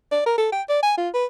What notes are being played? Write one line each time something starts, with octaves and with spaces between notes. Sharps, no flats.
D5
A#4
A4
G5
D5
G#5
F4
B4